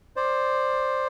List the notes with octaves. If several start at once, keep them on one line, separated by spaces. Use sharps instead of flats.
C5 D5